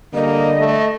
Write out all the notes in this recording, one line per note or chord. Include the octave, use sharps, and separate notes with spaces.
D3 G3 A#3 D#5
A3